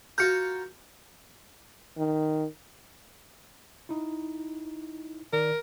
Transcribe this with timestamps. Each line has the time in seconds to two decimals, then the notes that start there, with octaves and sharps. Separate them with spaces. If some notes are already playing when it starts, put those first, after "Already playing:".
0.18 F4 F#4 A#4 G6 C#7
1.97 D#3
3.89 D#4 E4
5.33 D#3 A#4 D5